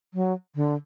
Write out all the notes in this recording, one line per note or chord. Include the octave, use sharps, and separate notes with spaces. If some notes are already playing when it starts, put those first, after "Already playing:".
F#3
D3